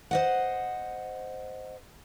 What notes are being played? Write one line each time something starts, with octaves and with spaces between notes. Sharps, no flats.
C5 D#5 F#5